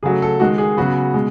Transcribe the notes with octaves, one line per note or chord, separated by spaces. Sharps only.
C#3 F#3 A3 G#4
A4
D#3 G#3 D#4 F#4
G#4
C#3 F#3 B3 F#4
B2 G#3